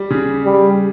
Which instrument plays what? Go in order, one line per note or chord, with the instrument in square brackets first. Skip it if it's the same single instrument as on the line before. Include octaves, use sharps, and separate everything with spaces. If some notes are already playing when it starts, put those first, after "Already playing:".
Already playing: [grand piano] G3
C#3
[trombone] G3